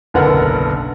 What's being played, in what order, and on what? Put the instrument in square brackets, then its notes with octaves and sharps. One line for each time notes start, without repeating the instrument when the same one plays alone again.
[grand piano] F#1 B1 D3 B3 A#4 F#5